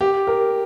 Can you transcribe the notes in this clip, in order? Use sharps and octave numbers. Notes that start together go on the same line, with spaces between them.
G4
A#4